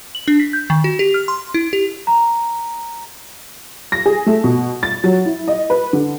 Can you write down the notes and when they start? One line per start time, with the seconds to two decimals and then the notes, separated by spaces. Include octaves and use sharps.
0.15 F#7
0.28 D4
0.40 B6
0.53 G6
0.70 D#3
0.84 F#4
0.99 G4
1.14 F6
1.28 C6
1.54 E4
1.73 G4
2.07 A#5
3.92 A#6
4.06 G#4
4.26 A3
4.44 B2
4.83 A6
5.04 F#3
5.26 E4
5.48 D#5
5.70 B4
5.93 D3